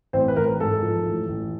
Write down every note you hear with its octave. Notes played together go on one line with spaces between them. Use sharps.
A1 C4 C5
B4
A1 A#4
G#2 A4
F3
A1
A1